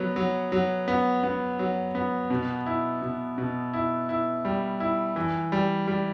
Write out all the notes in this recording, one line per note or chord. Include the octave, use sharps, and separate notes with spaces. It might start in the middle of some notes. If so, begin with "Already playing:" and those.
Already playing: F#3 B3
F#3
F#3
B3
B3
F#3
B3
B2
E4
B2
B2
E4
E4
G3
E4
E3
G3
G3